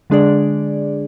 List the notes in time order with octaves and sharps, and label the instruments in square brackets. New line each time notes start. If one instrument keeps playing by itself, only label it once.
[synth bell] D3 G#3 D4 G#4 D5